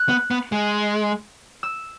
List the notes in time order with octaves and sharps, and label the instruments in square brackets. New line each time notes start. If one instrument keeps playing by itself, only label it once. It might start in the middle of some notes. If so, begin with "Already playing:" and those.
Already playing: [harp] F#6
[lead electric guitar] B3
B3
G#3
[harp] E6